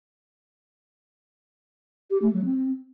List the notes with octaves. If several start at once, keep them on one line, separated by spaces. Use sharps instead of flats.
G4
A3
F#3
C4